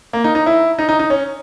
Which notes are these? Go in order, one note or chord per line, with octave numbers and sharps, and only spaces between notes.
A#3
D#4
D#4
E4
D#4
D#4
D#4
C#4